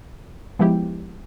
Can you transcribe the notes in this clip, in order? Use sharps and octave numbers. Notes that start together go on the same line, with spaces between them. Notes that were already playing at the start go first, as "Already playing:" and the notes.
F3 G#3 B3 E4 G4